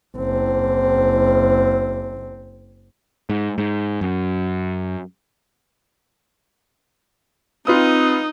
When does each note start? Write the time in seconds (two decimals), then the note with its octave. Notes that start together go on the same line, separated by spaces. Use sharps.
0.17 F#1 C4
3.30 G#2
3.58 G#2
4.01 F#2
7.67 C4 D#4 F4 B4 D#6